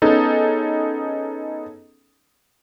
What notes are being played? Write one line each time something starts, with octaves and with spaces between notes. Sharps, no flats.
B3 C#4 D#4 G#4 A4